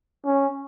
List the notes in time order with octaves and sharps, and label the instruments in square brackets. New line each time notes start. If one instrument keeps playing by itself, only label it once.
[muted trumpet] C#4